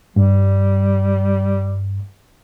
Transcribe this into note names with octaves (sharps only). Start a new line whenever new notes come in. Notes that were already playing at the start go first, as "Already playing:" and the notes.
G2 G3